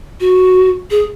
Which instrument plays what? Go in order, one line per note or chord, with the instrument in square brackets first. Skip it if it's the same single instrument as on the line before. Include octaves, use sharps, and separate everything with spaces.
[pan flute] F#4
G#4